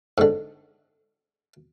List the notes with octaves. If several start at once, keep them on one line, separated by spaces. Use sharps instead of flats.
G#2 D3